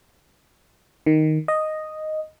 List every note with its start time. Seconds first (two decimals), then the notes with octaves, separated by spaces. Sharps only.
1.06 D#3
1.48 D#5